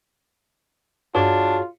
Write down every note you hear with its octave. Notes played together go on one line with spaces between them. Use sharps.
G2 D4 F4 F#4 G#4 C#5